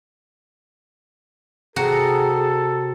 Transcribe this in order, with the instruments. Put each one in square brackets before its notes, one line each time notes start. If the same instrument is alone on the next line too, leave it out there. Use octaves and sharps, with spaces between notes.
[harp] C3 A#5 [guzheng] F#4 [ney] G#4 [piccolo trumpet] A4